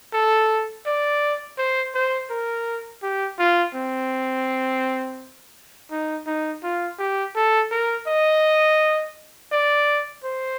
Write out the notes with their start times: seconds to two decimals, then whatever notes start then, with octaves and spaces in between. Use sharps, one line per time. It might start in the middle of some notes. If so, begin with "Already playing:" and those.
0.13 A4
0.86 D5
1.58 C5
1.95 C5
2.30 A#4
3.03 G4
3.39 F4
3.75 C4
5.91 D#4
6.27 D#4
6.63 F4
6.99 G4
7.36 A4
7.71 A#4
8.07 D#5
9.52 D5
10.24 C5